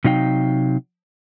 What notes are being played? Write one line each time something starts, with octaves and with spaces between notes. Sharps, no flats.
C3 F#3 D#4 F5 G5